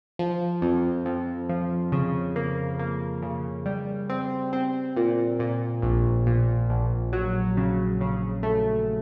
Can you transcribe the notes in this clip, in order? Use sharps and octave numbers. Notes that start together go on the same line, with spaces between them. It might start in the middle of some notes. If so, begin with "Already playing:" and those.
F3
F2
F2
F3
C#3
A#3
A#3
C#3
G3
C4
C4
A#2
A#2
A#1
A#2
A#1
F#3
C#3
C#3
A3